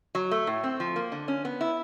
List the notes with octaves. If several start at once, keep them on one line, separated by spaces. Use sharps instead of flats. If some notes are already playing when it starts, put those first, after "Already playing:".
F#3
A3
A2
C4
F3
A#3
D3
C#4
B3
E4